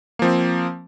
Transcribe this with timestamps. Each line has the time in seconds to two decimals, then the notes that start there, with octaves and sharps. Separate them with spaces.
0.19 A#3
0.22 F3
0.25 C4